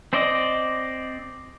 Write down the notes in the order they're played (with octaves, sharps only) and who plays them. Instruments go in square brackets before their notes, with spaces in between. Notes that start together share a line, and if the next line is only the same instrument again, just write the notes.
[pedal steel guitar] C4 C5 D5 D#5